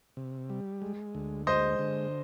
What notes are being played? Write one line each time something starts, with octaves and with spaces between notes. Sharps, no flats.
C3
G3
G#3
D2
G#3 C5 D#5
D3